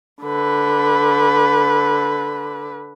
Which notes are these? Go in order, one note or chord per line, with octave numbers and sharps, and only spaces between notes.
D3 B4